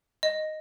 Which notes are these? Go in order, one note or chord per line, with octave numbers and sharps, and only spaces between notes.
D#5